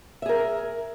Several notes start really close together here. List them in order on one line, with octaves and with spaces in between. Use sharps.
E5 G#4 A#4